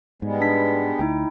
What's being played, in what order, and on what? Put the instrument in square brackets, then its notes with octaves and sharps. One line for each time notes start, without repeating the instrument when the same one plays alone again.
[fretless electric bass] G#2 [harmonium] G3 G#3 B3
[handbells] D4 B6
[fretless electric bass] D2 [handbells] D#4 E4 G5